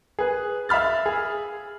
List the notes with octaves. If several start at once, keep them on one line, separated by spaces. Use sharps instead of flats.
G#4 B4
E5 F5 B5 F6 A6
G#4